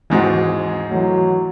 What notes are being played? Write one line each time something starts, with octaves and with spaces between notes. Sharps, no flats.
D#2 G#2 E3 G#3 C4 F#4
E3 F#3 A3